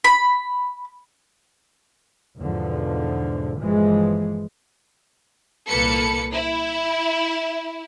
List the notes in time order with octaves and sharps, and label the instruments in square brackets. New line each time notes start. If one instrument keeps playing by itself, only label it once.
[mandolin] B5
[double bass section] E2 G#2 B2 D3 F3
G1 A#2 E3 F3 G#3
[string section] C2 A#2 A#3 A4 B4 C#7
E4